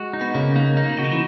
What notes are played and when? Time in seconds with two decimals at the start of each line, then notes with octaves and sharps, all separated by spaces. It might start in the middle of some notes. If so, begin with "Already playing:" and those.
Already playing: G#3 F#4
0.13 D#4
0.21 B3
0.34 C#3 A#3
0.56 A#3 D#4
0.77 A#3 D#4
0.89 B2
0.97 C#3 F#4
1.04 D#3
1.12 E3